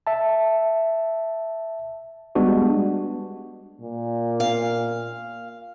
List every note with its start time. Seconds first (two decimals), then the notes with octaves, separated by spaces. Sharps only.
0.07 E5 A5
2.35 G3 G#3 B3 D4 F#4
3.81 A#2
4.40 F5